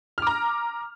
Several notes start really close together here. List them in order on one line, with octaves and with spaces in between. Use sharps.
F6 D6 A#5